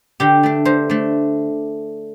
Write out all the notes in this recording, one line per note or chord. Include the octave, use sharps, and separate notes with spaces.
D3 G4
A3 D4
D3 C5
A3 D4